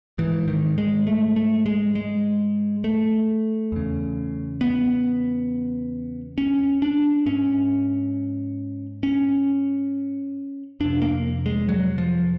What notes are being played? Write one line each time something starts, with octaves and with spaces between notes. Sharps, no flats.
G#2 E3
D#3
G#3
A3
A3
G#3
G#3
A3
E2 C#3
B3
C#4
D4
G#2 C#4
C#4
F2 C3 D4
A#3
G#3
F#3
F3